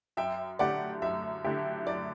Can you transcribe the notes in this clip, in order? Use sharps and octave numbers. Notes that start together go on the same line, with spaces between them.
F#2 E5 G5
D3 A3 E4 G4 D5 F#5
F#2 E5
D3 A3 E4 G4
F#2 D5